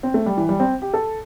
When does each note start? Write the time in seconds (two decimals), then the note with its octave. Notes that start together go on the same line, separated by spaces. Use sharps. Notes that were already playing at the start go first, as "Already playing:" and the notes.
0.03 C4
0.14 A3
0.26 G3
0.37 E3
0.49 G3
0.60 C4
0.82 G4
0.94 A4